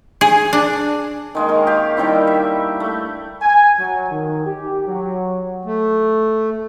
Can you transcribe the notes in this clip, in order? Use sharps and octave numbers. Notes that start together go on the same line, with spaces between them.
G#4
D4
D#3 G#3 A#3
A#4 C#6
G4 F5
D#3 G3 D4 E4
E5
A3
G#5
F#3
D#3
G4
F#3
A3